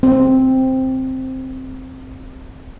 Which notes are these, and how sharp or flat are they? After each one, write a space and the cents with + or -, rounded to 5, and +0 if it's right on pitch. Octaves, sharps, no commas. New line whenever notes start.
C4 +0